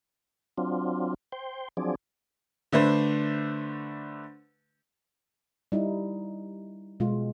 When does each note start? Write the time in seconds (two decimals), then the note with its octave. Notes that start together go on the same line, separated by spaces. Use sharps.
0.58 F#3 C4 D4 F4
1.32 C5 G5
1.77 F3 F#3 C4 D4 G#4 D5
2.72 D3 A3 D4 B4 C5
5.72 G3 D#4 E4
7.00 B2 G#3 F4